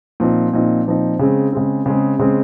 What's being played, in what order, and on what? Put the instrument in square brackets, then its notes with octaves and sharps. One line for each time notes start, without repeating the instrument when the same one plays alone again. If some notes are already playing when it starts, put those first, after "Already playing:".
[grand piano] A#2 F3 C4 D#4
A#2 F3 C4 D#4
A#2 F3 C4 D#4
C#3 G#3 C4
C#3 G#3 C4
C#3 G#3 C4
C#3 G#3 C4